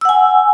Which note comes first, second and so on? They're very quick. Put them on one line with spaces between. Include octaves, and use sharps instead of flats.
E6 F#5 G#5